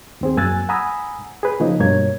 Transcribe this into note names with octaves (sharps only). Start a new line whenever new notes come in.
D#2 C4 G#4
F#2 A#3 G#5 E6 F#6 A6
F#5 G#5 A#5 B5 D#6 E6
G#4 B4
C#3 F3 A#3 D#4
G2 B2 A#3 C#5 G#6